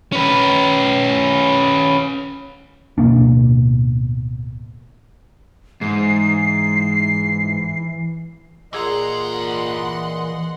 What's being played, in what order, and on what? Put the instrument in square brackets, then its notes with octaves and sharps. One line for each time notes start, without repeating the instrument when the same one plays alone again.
[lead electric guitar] C#4 B4
[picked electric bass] D1 B2 A#3 D4
[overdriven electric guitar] G#2 [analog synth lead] E3 [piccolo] C7
[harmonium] A#2 D#5 [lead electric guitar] E3 A#5 [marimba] G#4 E6 [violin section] F#5 C6